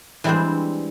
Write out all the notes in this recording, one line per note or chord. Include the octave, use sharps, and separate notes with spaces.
E3 G3 G#3 C4 D4 C5